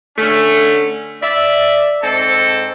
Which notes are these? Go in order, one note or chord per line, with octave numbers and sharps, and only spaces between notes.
D3 A3 C#4
D5 E5
G#2 C4 A4